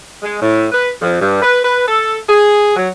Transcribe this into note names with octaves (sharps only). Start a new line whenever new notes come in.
G#3
A2
B4
F2
G2
B4
B4
A4
G#4
F#3